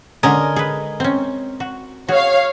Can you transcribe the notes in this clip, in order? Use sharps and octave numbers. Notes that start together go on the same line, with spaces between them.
D3 G#3 C#4 A#4 D#5 G#5
G#4 B4
C4 C#4
F#4
F#4 G#4 C#5 F5